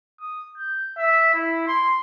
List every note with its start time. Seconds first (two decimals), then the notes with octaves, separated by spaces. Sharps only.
0.21 D#6
0.58 G6
0.98 E5
1.34 E4
1.68 C6